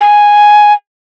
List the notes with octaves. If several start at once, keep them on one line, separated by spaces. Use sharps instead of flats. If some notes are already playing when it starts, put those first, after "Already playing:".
G#5